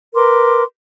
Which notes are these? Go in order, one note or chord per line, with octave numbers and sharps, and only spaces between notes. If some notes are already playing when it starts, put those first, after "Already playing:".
A#4 B4 C6 D6